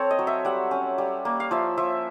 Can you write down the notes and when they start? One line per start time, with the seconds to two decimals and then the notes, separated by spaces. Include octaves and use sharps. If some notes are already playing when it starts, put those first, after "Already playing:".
Already playing: C4 A4 C#5
0.10 D#5
0.19 F#3
0.27 E5
0.45 G3 F#5
0.71 C#4
0.98 G3
1.25 A#3
1.40 F5
1.51 F3 E5
1.77 F3 E5